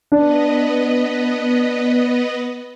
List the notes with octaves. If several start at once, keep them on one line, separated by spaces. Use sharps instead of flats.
B3 D4 B4 D#5